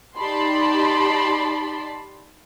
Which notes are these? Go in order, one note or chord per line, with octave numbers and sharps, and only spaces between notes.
D#4 G4 D5 A5 B5 C6